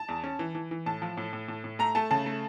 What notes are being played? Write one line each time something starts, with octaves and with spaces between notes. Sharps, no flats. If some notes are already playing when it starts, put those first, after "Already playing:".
Already playing: A5
E2
C#4
E3
E3
E3
A2 A5
F3
A2
A2
A2
A2
A3 A#5
A3 A5
C#3 A5
A3